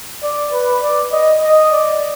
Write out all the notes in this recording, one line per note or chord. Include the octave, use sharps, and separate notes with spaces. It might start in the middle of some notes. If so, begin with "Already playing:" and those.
D5
B4
D5
D#5
D#5
D5